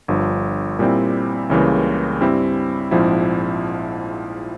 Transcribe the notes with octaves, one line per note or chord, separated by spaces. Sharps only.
G1 G2 F3
A#2 G3 C4 E4
C#2 C#3 E3 G3 A#3
G2 G3 C4 E4
A#1 G#2 F3 C4 E4